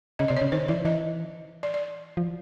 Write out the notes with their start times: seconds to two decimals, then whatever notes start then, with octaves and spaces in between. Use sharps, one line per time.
0.19 C#3 D#5
0.28 C3 D5
0.37 C#5
0.42 C#3
0.52 D#3 C5
0.68 E3 D5
0.85 E3 D#5
1.63 D5
1.74 D5
2.17 F3